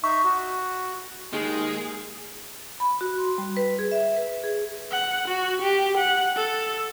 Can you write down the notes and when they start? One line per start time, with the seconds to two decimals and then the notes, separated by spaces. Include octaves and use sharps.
0.04 D#4 E5 C#6
0.25 F#4
1.33 D#2 D#3 G#3 G#4
2.80 B5
3.01 F#4
3.18 C6
3.38 G3
3.57 B4
3.79 G#4
3.91 E5
4.16 B4
4.44 G#4
4.92 F#5
5.28 F#4
5.62 G4
5.97 F#5
6.36 A4